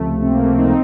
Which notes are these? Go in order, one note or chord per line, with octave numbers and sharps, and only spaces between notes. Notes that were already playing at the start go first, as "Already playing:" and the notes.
Already playing: C#2 C3 F3 A3
C4
A#3
A3 C4
C4 D#4